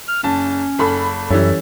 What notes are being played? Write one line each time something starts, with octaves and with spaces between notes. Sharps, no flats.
F6
F#1 C#4 A5
F#1 A4 B5
F#2 E3 G3 C#4 A4